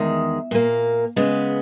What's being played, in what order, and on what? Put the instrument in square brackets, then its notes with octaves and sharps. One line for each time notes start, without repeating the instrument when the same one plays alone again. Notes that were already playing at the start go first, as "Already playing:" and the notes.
Already playing: [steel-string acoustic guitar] E2 D#3 G#3 E5
A#2 A#3
C#3 G#3 B3